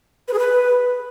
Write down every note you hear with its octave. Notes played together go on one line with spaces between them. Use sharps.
B4
G#4
B4